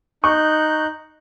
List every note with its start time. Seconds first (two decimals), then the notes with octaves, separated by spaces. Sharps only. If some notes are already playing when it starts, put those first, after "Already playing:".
0.24 D#4 C#6 F#6 G6